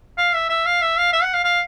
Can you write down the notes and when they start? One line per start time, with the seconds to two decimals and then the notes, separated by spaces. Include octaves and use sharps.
0.18 F5
0.35 E5
0.49 E5
0.66 F5
0.82 E5
0.97 F5
1.13 E5
1.23 F#5
1.34 F5
1.44 F5